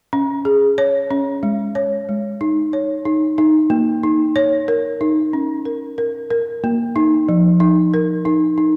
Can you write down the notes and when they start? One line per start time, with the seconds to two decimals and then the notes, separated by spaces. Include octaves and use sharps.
0.13 C#4
0.45 G#4
0.78 C#5
1.11 C#4
1.43 G#3
1.75 C#5
2.09 G#3
2.41 D#4
2.73 C#5
3.05 D#4
3.38 D#4
3.70 A#3
4.03 D#4
4.36 C#5
4.68 A#4
5.01 D#4
5.33 C#4
5.65 A#4
5.98 A#4
6.31 A#4
6.64 A#3
6.96 D#4
7.29 F3
7.60 D#4
7.94 A#4
8.25 D#4
8.58 D#4